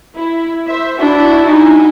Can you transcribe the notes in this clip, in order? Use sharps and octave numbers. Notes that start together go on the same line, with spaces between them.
E4
C5 E5
D4 E4 F#4
D#4 G#5